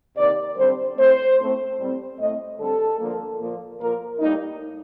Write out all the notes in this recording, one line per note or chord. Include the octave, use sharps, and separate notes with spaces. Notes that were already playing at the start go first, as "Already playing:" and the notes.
C3 D#3 A#3 D5
D3 G3 C4 C5
A2 A3 C4 C5
A2 A3 C4
A2 G3 C4
A2 A3 C4 D#5
D3 G3 C4 A4
D3 F3 A#3
A#2 F3 A#3
A#2 F3 A#3 A#4
A2 G3 A#3 D#4